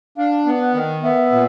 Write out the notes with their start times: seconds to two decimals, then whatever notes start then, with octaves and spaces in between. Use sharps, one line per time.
0.17 D4 F5
0.46 B3
0.60 F#5
0.74 D#3
1.03 B3 E5
1.32 A#2